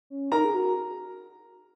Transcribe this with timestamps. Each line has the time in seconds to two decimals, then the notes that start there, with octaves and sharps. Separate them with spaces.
0.10 C#4
0.32 D#4 A#4 A#5
0.45 G#4
0.54 F#4